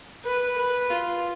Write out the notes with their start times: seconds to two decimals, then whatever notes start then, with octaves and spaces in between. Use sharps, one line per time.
0.25 B4
0.58 B4
0.90 F4